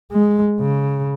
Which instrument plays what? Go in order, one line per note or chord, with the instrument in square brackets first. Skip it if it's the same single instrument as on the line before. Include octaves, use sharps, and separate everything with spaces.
[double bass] G#3
C#3